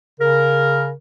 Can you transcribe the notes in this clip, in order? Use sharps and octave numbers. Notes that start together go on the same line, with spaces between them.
C#3 A#4